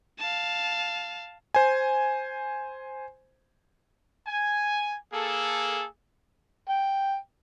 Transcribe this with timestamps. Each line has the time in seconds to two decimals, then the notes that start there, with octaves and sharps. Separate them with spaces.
0.19 F5 A5
1.55 C5 G#5
4.27 G#5
5.13 A#3 G#4 A4
6.69 G5